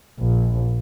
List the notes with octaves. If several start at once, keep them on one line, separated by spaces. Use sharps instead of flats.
A#1